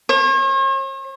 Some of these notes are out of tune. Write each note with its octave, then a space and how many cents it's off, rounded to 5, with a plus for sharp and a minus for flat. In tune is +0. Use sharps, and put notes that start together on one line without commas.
C#5 -45